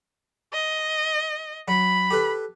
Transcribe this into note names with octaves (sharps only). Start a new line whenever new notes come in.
D#5
F#3 B5
G4 A4 B4